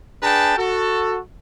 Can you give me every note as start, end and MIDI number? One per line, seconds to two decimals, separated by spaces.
0.23 0.57 62
0.23 0.57 68
0.23 0.57 71
0.23 0.57 79
0.23 0.57 81
0.58 1.18 66
0.58 1.18 69